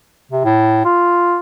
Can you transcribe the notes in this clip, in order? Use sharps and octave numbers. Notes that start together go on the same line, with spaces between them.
C3
A2
F4